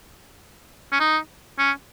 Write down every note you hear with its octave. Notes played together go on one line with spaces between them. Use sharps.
C#4
D#4
C#4